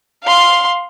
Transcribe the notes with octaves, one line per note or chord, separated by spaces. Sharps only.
F5 C6